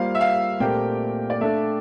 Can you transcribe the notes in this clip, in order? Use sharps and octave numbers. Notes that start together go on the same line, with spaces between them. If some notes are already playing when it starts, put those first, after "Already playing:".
Already playing: G3 A#3 F4 C5 F5
E5
F5
A#2 A3 C4 G4 A#4 G5
D5
A3 D4 A4 E5